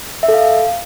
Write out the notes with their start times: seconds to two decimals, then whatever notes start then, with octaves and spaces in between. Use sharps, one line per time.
0.23 E5
0.28 A4
0.34 F5